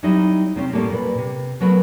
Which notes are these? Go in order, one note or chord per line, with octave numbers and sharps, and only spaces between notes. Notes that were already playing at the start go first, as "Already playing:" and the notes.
F#3 G3 C4 D#4 E4 E5
C3 C4 C#4
A2 C3 D#3 G3 A3 A#3
A#2 B4
C3
F#3 A3 B3 A#4 B4